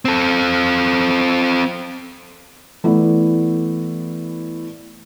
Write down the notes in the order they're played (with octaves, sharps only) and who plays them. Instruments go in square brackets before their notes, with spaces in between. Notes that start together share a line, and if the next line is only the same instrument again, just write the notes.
[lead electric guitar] C4 A4
[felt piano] E3 A3 B3 E4 D5